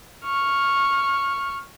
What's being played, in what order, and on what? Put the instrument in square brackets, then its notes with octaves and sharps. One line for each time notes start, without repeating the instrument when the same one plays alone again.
[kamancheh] C#6 F6